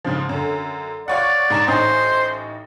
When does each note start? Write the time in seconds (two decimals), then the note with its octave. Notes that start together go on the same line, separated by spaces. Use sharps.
0.05 G#2 C#3 F3
0.29 F#2 D3
1.08 F4 C#5 D5 F#5
1.50 G#2 A#5 E7
1.68 A1 C#4 D#4 C5